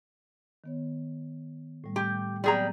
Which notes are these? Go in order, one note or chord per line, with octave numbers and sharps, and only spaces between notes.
D#3 B3 C#5
A2 G3 A3
G4
F#3 G3 B3 C4 G#4 A#5